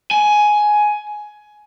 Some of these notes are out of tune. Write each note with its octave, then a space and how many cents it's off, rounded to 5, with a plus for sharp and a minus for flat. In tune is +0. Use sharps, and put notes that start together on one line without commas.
G#5 +10